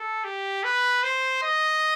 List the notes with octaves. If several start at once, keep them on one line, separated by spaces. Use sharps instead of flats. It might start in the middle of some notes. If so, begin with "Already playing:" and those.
Already playing: A4
G4
B4
C5
D#5